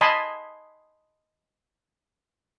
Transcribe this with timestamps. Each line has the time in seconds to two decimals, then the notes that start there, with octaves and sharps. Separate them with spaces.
0.01 D#5 G#5 A5 B5 C6